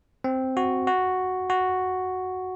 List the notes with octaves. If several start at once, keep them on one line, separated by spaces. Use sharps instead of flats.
C4
F#4
F#4
F#4